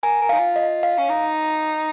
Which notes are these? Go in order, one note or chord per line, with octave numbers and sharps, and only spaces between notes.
A#4 G#5
A#4
F5
D#4
F4
D#5
F5
C#4
D#4